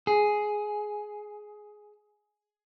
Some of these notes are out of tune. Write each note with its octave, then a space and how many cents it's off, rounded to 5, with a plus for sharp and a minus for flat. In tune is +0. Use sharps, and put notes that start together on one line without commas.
G#4 +10